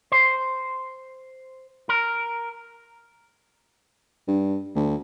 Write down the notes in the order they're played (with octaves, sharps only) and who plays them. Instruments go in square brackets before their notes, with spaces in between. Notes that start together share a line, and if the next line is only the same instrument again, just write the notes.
[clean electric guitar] C5
A#4
[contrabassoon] G2
D2